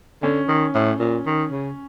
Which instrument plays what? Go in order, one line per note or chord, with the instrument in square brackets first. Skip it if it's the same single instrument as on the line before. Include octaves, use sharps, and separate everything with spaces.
[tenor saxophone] D3 [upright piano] C#4
[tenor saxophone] D#3
A2
A#2
D#3
C#3